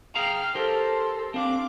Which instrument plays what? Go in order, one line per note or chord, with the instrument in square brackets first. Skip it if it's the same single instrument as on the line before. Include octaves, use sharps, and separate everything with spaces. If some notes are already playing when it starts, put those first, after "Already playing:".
[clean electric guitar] G#4 F5 A#5 [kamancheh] G5 F6
[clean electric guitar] G4 A#4 [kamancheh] A4 C5
[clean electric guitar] C4 D4 [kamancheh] F5 D6